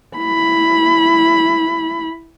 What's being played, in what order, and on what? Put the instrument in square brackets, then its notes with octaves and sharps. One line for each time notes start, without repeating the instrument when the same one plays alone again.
[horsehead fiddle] E4 B5